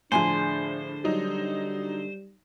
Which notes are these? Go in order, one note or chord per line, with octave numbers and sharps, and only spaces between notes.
A2 D3 F3 D4 G#4 C5 G#5
F#3 G3 D#4